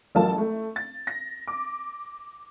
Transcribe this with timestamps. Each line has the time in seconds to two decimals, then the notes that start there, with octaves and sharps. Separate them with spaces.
0.15 A1 F#3 F4 A4 A#4 A5
0.38 A3
0.76 A6
1.07 A#6
1.47 D6